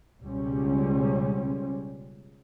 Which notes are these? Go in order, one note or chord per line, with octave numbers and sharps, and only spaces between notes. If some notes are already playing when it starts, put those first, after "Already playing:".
C#2 B2 G3 C4 C#4